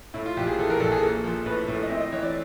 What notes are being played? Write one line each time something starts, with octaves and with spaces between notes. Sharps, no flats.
A2 E4
F4
A#1 G4
G#4
E3 A4
A#4
A#1 A4
G#4
A#3 A4
F3
A2 B4
A2
D#5
C4 E5
D#5
E3 C#5
D5